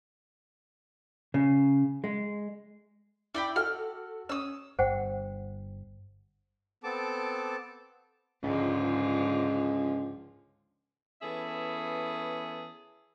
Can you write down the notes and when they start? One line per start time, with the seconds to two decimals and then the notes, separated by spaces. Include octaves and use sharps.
1.34 C#3
2.04 G#3
3.35 E4 D5 G5 B5
3.56 F#4 A4 F#5 F6
4.29 C#4 D#6 E6
4.79 G1 G2 C5 F#5 G5
6.84 B3 C4 A4 A5 D6
8.43 C#2 G#2 D3 F3
11.22 E3 B3 C#4 G#4 A4 E5